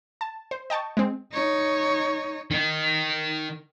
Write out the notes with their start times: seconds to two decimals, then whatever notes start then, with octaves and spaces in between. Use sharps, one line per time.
0.21 A5
0.51 C5
0.70 D#5 G5 A5 C#6
0.97 G#3 C4
1.32 D#4 C#5
2.51 D#3 D#4